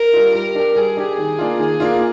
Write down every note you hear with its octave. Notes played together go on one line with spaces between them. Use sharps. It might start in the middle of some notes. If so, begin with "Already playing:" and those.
Already playing: A#4
G3 D4 F4
G3 A#4
D4 G4
G3 G#4
D4 G4
D#3
A#3 D4 F4
D#3 G#4
A#3 D4 F4